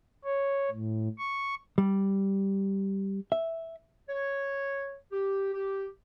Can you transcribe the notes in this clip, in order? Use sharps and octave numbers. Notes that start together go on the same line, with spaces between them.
C#5
A2
C#6
G3
E5
C#5
G4
G4